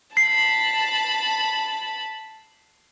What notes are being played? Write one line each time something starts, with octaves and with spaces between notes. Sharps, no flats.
A5 B5 C7